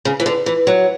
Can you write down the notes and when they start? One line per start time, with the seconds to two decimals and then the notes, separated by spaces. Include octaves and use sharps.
0.05 C#3
0.20 E3
0.26 D3
0.46 E3
0.67 F#3